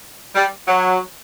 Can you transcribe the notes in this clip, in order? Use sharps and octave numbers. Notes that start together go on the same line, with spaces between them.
G3
F#3